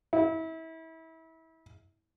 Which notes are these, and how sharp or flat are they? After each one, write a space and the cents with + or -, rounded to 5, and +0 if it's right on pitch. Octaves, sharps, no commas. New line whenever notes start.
E4 -30